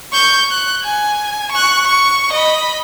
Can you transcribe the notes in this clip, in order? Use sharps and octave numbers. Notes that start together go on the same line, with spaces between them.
C#6 G6
F#6
G#5
C#6 F#6
C#6
D#5 B5